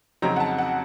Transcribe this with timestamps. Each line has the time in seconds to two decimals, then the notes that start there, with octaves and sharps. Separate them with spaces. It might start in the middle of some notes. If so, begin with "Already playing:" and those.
0.22 F2 C#3 F#3 C4 D#4 A#5
0.36 F#5
0.40 A5
0.58 F#5